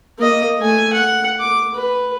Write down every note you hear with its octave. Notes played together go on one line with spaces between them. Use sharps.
A#3 D#5
A3 G#5
F#5
D6
B4